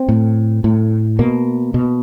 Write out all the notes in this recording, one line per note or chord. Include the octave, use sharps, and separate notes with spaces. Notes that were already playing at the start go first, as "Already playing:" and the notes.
Already playing: C4
A2
A2
B2 A#3
B2